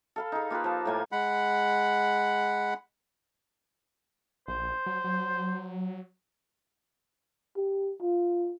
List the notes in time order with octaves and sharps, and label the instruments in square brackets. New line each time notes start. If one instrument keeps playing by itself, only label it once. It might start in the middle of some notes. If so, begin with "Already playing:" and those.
[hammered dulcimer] A4 F5 B5
D#4 G#4
A#3 F4 G4 B4
F3 A5
A2 A#3 G#5
[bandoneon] G#3 F#5 B5
[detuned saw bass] A#1 [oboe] C5
[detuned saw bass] F#3
F#3
[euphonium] G4
F4